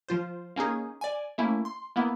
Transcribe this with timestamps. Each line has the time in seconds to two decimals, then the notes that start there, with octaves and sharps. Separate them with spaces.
0.08 F3 F4 C5
0.56 A#3 C#4 D#4 G#4
1.01 D5 G#5
1.38 A3 A#3 C#4 E4
1.65 C6
1.96 A#3 B3 E4